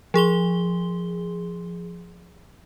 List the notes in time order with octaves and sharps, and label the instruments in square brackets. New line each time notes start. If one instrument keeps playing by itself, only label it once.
[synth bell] F3 G#4 C6 G7